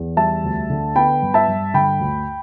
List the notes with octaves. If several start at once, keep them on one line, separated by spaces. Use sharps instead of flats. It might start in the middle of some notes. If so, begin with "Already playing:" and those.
Already playing: E2
G3 E5 A5
D2
D3
B3 G5 B5
G2
E5 A5
G2
D3 G5 B5
D2